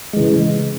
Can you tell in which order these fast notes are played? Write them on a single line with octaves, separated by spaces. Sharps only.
G#3 E3 C#3